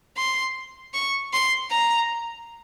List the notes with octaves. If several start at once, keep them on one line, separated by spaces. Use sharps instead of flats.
C6
C#6
C6
A#5